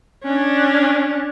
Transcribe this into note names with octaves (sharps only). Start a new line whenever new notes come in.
C#4 D4